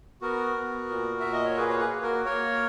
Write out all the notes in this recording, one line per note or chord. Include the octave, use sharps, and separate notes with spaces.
B3 F#4 A#4
B3
A#2
A#2 E5
D#5
C#5
A#3 G#4 B4
C#5
G#4 B4
A#3
F#4 A#4
A#3 A#4 C#5